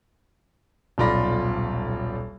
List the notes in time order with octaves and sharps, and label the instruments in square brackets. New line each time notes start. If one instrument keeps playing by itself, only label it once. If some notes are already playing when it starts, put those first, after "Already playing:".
[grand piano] D#1 B1 F4 D5 B5 A#6